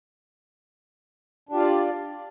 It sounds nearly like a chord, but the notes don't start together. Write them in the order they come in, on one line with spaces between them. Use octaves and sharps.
D4 G4 F4 F5 D5